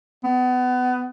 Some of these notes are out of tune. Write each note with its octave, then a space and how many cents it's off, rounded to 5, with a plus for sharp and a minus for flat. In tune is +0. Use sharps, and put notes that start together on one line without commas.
B3 +25